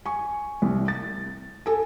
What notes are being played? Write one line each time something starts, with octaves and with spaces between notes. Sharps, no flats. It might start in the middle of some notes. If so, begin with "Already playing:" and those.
G#5 C#6
C2
A6
A4 G#5